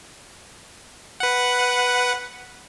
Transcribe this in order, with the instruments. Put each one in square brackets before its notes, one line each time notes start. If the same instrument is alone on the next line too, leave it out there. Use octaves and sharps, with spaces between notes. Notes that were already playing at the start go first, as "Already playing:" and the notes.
[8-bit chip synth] B4 F#5